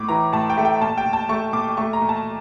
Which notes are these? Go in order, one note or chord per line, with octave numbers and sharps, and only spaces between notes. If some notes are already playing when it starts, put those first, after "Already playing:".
Already playing: A2 D6
E3 A#5
A2 A5
G5
A3
G5
A#2 A5
G5
A#2
A5
A3 C#6
A#2 D6
A3 C#6
A#5
A#2
A5